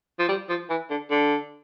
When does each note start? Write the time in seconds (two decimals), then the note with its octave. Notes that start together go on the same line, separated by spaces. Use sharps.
0.19 F3
0.29 G3
0.49 F3
0.70 E3
0.90 D3
1.11 D3